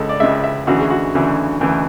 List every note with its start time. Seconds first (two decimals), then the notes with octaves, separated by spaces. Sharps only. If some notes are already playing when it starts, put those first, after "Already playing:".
Already playing: C#2 C#3 G#3 A4
0.09 D5
0.20 C#2 C#3 G#3 E5
0.44 E5
0.67 D2 C#3 E3 F#4
0.79 G#4
0.90 F#4
1.15 D2 C#3 E3
1.61 D2 C#3 E3